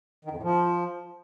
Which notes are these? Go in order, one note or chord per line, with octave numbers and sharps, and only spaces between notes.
D#3
F2
A2
F3